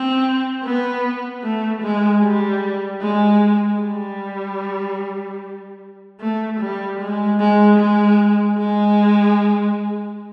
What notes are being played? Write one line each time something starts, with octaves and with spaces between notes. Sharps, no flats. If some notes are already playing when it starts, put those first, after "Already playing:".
Already playing: C4
B3
A3
G#3
G3
G#3
G3
A3
G3
G#3
G#3
G#3
G#3